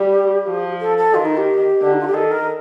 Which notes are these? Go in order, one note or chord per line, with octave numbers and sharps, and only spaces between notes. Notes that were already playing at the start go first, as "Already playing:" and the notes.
Already playing: G3 G4
F3
A4
A4
D#3 F4
D#4
G4
D3
D#4
F4
G4
D#3 A4
A#4